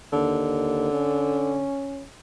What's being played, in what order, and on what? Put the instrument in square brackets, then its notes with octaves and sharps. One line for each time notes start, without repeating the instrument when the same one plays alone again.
[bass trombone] D#2 [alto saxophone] D3
[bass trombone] C#4